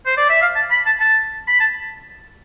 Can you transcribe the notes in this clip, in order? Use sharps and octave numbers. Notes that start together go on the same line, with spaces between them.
C5
D5
E5
F5
A5
B5
A5
A5
B5
A5